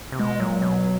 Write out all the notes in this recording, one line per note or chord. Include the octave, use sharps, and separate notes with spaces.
C3
B2 G#3
A#2 F#3
B2